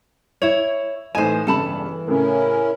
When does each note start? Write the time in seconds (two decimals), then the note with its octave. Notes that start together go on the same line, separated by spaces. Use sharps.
0.42 E4 C#5 F7
1.15 A2 E3 D#4 C5 G#5 E7
1.47 G1 C#3 E3 G3 A4 A5 B5
2.08 A2 C#3 C#4 E4 A#4